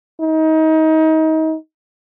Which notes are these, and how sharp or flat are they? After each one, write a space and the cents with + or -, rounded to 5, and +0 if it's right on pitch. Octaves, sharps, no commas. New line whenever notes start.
D#4 +30